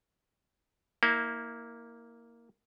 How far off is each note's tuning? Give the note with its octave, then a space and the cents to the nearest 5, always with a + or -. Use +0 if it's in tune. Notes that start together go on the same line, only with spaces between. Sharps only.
A#3 +0 E4 -25